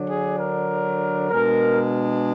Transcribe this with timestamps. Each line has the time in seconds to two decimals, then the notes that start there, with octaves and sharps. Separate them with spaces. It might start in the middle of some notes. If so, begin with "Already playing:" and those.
Already playing: D3 F#3 D4
0.09 G#4
0.39 A#4
1.30 B2 G#3 D4 A#4